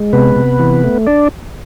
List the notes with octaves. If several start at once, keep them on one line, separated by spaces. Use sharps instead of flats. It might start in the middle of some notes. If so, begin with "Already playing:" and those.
Already playing: G#3
C3 B3 B4
C3
E3
A3
D4 D5